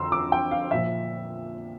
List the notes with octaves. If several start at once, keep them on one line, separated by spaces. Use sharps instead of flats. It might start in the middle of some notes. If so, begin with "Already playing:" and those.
Already playing: F2 D3 F3 A#5 C6 E6
D6
G5
F5
A#2 F3 E5